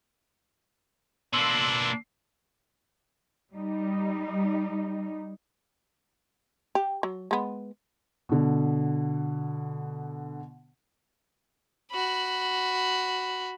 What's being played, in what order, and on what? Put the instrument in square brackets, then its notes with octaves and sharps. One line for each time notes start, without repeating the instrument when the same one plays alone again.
[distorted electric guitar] B2 A#3 [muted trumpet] D4 [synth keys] C6 E6 [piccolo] F#7
[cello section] G3 D#4
[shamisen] G4
F#3
G#3 B3
[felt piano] B2 D3
[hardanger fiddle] F#4 B5